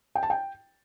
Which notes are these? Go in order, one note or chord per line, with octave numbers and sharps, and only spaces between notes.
G5
A5
G5